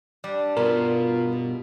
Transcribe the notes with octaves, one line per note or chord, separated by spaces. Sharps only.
G3 D4
G2 B2 F4 A#4